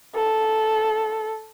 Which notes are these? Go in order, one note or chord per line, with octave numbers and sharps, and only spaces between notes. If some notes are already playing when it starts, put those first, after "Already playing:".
A4